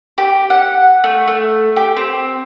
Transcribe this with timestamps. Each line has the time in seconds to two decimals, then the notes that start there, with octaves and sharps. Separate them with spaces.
0.18 G4
0.50 F#5
1.04 A3
1.28 A3
1.76 G4
1.97 C4